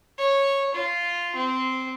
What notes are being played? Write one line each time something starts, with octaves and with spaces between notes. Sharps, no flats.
C#5
F4
C4